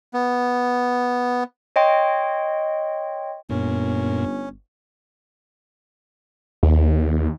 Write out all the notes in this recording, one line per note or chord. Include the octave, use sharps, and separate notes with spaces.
B3
C#5 D#5 G5 C6
G1 F#2 A#2 C#4
D#2